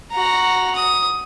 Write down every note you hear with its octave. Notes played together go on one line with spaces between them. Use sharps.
F#4 A#5
D#6